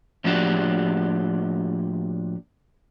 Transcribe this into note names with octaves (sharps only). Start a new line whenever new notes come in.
A2 F3 A#3 D4 F#4 G4